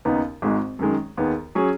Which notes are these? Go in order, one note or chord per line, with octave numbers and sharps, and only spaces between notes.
D#2 C#3 B3 D#4
G#1 G#2 G#3
F#2 D#3 G#3
D#2 D#3 B3 G#4
F#3 C#4 G#4